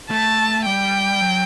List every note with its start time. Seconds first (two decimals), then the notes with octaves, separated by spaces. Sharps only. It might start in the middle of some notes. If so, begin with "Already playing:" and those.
0.10 A3 A5
0.66 G3 G5
1.21 F#3